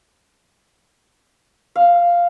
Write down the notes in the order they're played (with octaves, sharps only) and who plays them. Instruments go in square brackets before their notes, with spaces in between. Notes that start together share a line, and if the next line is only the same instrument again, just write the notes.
[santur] F5